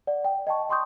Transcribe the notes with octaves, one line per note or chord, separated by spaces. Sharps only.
D5 F#5
G5
D#5 G5 A5 C#6
G5 C6 C#6 D#6 G6